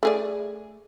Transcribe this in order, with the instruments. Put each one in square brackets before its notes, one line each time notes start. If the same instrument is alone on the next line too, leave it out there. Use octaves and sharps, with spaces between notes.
[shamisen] A3 G#4 D5